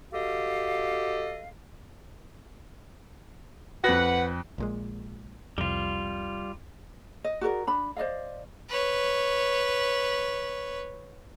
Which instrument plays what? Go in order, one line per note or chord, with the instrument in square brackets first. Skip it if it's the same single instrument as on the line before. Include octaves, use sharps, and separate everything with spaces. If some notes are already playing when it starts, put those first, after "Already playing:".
[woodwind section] F#4 G4 A4 D#5 F5
[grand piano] F2 F#6 A#6 [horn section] B4 F#5
[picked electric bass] A#1 A#2 G#3
[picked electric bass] C2 F2 [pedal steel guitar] G3 F4
[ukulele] D#5
F#4 G#4 A#4 D5
D4 B5
C5 D5 D#5 F5
[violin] B4 C#5